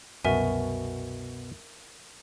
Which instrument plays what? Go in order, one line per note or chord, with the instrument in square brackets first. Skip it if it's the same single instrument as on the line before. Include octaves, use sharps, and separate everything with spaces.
[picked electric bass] C2 F#2 [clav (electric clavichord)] B2 F#4 F#5 [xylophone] A#4 E5 G#5